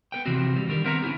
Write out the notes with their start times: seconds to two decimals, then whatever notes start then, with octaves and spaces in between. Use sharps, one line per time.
0.12 B3 B4 G5
0.26 C3 E3 F3 C4 F#4
0.56 G3
0.68 D3 D#3 G3 A#4
0.84 B3 C4 A#4 E5 F#5 A#5
1.02 D3 C#4 E4 G4